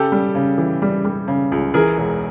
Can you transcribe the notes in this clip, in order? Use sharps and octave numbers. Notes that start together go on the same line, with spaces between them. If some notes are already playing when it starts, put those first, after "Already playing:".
Already playing: C#3 G4 A4
G3
C#3
E3
G3
G3
C#3
C#2
E3 G#4 A#4
E1